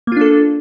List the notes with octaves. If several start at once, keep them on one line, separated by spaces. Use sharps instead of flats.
A#3 D4 F4 A4